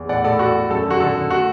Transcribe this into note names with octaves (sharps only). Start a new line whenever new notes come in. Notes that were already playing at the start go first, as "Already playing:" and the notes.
Already playing: E2
A2 D5 F#5
A2 A4 D5
A2 F#4
A3
F#2 A4
D3 F#4
D3 A4
D3
A3 F#4